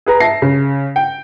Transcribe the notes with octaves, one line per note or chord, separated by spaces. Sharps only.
G#4 B4 A#5
E5 A5 A#6 C7
C#3
G5